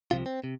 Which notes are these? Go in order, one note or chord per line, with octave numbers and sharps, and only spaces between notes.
C2 C3 F3 F4
C4
C3